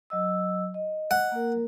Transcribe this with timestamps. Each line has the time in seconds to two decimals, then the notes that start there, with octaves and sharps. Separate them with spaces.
0.10 F#3 D#5 E6
0.74 D#5
1.11 F#5
1.32 A#3 A#4